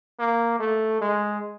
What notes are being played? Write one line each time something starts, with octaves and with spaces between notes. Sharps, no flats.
A#3
A3
G#3